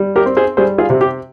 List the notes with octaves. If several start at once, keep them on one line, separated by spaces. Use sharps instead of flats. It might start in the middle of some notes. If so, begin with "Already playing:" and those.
Already playing: G3
G4 A#4
C4
G#4 C5
G3 G#4 C5
F4 G#4
C3
G4